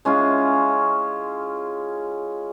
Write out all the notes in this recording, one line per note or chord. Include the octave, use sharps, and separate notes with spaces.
G#3 C#4 E4 F4